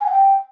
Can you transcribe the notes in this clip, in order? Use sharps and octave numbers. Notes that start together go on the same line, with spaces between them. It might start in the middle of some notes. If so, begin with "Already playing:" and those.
G#5
F#5
G5